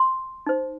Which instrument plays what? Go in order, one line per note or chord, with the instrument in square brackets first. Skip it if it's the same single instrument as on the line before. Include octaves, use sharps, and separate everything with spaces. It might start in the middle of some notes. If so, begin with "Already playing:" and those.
Already playing: [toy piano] C6
D#4 C5